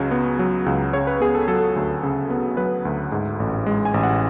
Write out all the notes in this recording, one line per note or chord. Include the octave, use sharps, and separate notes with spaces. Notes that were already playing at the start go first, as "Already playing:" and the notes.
Already playing: C#2 C#3 F#3
B3
F#3
C#2
C#3 C#5
B4
B3 G#4
A4
F#3 A4
D2
C#3
B3
F#3 B4
D2
G#2
A1
G#3
G#5
A1
F#5